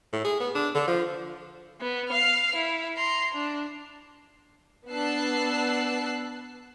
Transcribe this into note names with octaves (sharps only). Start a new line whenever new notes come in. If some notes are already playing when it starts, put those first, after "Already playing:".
A2
G#4
B3
D4
D3
F3
B3
F5 F6
E4
A#5 C6
D4
B3 D4 A5 E6 F#6 C7